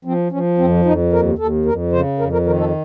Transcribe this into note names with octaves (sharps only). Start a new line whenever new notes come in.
F3 C4
F3 C#4
F2 C4
F2 D#4
D#2 A#4
D#2 A4
F2 A#4
C#3 C5
F2 A#4
A#4
D#3 A#4
A4